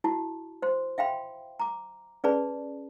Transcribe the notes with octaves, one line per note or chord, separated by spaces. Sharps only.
E4 F#4 A5
C5 C6
E5 F5 G5 B5 C6
A#5 D6
C#4 G#4 B4 D5 A5 B5